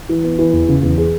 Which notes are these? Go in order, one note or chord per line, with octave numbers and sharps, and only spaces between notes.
E3
B3
E3
E2
C#3
E2
G#4